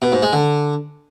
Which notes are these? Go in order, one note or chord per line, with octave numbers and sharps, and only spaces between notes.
B2
G#2
G#3
D3